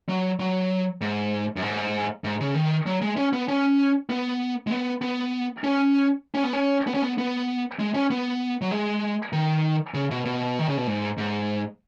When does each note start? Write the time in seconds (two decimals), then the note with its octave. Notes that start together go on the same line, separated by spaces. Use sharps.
0.09 F#3
0.40 F#3
1.01 G#2
1.56 F#2
1.62 G#2
2.24 G#2
2.40 C#3
2.55 D#3
2.86 F#3
3.01 G#3
3.17 C#4
3.33 B3
3.48 C#4
4.10 B3
4.67 G#3
4.71 B3
5.02 B3
5.64 C#4
6.35 C#4
6.44 B3
6.53 C#4
6.87 B3
6.94 C#4
7.02 B3
7.18 B3
7.79 G#3
7.94 C#4
8.10 B3
8.61 F#3
8.71 G#3
9.33 D#3
9.94 C#3
10.11 B2
10.25 B2
10.59 D#3
10.68 C#3
10.77 B2
10.87 G#2
11.18 G#2